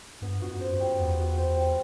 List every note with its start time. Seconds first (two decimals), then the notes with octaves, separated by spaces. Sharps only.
0.22 G2 B3
0.42 G2 F#4
0.48 F#2
0.60 C5
0.74 F#2
0.80 G3
0.99 E2 B3
1.19 F#4
1.38 C5
1.57 G3